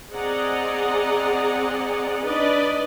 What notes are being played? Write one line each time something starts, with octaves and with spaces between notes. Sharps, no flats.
C4 G#4 D5 D#5 F#5 A#5
D4 D#4 B4 D5 D#5